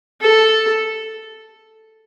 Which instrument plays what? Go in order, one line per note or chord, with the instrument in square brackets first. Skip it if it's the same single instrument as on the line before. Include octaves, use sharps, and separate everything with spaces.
[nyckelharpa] A4